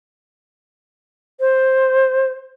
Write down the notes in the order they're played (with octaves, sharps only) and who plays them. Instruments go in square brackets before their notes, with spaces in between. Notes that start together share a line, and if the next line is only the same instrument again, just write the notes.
[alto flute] C5